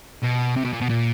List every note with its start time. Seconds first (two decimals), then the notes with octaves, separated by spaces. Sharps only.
0.23 B2
0.56 C3
0.65 B2
0.73 A#2
0.81 B2
0.89 A#2